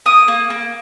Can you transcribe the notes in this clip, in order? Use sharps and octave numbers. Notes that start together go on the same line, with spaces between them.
A#3 D#6
A#3
A#3